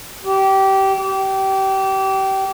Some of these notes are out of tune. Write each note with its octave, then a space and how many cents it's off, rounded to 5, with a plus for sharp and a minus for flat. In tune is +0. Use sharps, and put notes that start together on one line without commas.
G4 -20
G4 -25